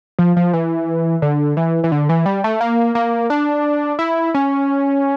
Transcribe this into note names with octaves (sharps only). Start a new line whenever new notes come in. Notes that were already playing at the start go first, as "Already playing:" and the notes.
F3
F3
E3
D3
E3
E3
D3
E3
G3
A3
A#3
A#3
D4
E4
C#4